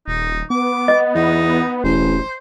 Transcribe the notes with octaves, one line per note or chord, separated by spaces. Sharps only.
D#1 D#4
B3 D6
D#5
E2 D#4
E1 A1 C5